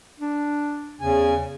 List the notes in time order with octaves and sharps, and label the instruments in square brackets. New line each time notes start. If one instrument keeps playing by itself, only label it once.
[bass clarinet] D4
[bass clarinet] E2 [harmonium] C#3 G#5